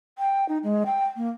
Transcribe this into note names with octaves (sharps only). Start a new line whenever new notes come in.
G5
D#4
G#3
G5
A#3